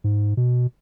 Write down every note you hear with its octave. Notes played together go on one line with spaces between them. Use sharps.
G#2
B2